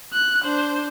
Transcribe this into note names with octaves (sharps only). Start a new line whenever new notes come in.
F#6
D4 C5